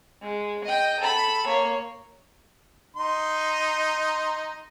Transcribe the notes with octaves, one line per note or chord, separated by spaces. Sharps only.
G#3
D#5 G5
A4 B5
A#3 C#5
D#4 C6